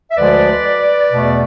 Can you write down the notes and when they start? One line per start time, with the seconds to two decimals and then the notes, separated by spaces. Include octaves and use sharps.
0.11 E5
0.18 D2 D3 F3 G#3 B4 D5
1.12 E2 B2 A3